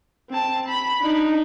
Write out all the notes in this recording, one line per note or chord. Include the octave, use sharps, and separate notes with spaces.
C4 A5
B5
D4 D#4